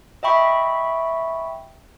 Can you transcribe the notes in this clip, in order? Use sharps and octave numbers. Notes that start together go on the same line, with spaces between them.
D#5 E5 G5 B5 C#6